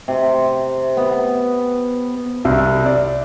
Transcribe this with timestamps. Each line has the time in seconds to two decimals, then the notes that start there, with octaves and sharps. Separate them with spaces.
0.08 C3
0.97 B3
2.45 C2
2.86 D5